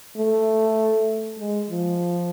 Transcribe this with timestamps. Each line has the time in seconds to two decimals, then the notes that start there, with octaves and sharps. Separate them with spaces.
0.17 A3
1.39 G#3
1.70 F3